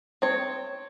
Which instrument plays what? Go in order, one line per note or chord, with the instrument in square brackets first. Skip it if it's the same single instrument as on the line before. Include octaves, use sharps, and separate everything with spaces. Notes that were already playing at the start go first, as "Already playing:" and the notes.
[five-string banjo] C4 C#5